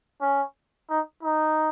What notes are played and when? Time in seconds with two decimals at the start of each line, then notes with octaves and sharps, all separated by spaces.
0.22 C#4
0.90 D#4
1.23 D#4